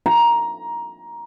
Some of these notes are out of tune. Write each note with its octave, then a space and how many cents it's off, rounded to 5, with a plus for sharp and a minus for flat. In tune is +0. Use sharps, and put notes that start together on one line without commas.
A#5 +15